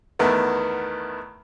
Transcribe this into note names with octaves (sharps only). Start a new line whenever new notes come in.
E2 D#3 A3 B3